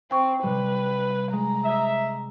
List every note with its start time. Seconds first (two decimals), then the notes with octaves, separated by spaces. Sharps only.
0.11 C4 G5 C#6
0.43 C3 G3 B4
1.33 G#3 A#5
1.65 D#5 E5 G#6 B6